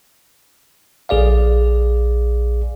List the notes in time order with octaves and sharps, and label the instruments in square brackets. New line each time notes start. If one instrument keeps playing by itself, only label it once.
[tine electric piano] A#1 G#4 D5 F5